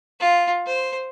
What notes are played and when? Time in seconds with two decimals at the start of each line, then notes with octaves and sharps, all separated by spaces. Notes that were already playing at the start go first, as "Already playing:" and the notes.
0.20 F4
0.66 C5